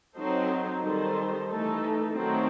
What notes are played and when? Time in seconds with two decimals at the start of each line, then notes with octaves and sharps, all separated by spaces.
0.16 F#3 C4 D#4 A4 C5
0.82 D#3 G3 D#4 A4 C5
1.49 E3 A3 D#4 A4
2.15 D#3 F#3 A3 C4